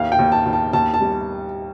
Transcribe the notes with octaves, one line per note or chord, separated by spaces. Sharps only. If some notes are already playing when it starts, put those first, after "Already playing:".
Already playing: D#2 A2 F5
G5
D#2
A5
D#2
A5
D#2 A5
A5
G3